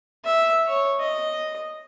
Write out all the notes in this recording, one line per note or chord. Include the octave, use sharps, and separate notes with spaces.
E5
C#5
D#5